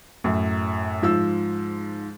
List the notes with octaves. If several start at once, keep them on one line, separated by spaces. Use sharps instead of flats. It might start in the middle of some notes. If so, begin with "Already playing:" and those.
F#2 A2
G#2 F3 E6